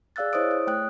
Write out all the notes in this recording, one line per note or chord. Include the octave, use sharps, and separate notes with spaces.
G#4 D5 F5 E6 F#6 A6
E4 C5 C#5 D#5 D#6 D7
C#5
A3 G5 D#6 F#6